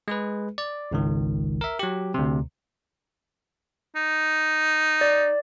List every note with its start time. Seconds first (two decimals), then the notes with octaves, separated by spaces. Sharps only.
0.08 G#3 G#4 B4
0.58 D5
0.91 G#1 C#2 D#3
1.61 A#4 E5
1.79 F#3 G4
2.14 D2 C3
3.96 D#4
5.01 D5